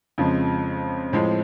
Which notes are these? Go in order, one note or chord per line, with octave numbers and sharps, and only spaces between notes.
F2 C#3 F3 G#3
A2 F3 G#3 C4